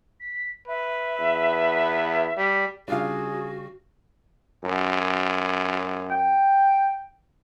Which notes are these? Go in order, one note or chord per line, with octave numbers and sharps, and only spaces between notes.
B6
B4 E5
E2
G3 B6
C#3 G3 D4 F4 F#4 G#4 F5
F#2
G5